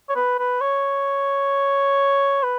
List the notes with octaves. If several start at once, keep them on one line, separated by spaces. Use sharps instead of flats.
C#5
B4
B4
C#5
B4